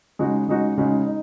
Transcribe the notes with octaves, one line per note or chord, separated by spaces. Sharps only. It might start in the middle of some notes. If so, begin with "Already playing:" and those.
C#3 G#3 D#4 F#4
C#3 G#3 D#4 F#4
C#3 G#3 D#4 F#4
D#4